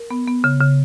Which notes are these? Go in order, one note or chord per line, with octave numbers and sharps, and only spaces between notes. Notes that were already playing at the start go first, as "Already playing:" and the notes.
Already playing: A#4
B3
B3
C#3
C#3